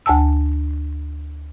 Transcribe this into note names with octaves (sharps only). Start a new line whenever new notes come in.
D2 G#5 A5 E6